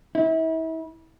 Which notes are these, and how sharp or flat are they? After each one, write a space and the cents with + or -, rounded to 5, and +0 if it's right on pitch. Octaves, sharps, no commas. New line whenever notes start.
E4 -35